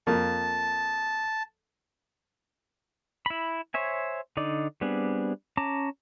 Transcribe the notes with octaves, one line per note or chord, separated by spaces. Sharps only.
F2 A#3 A5
E4 B5
C5 C#5 E5 G#5
D3 D#4 D5
G3 B3 C4 D4 G#4
C#4 A5 A#5 D6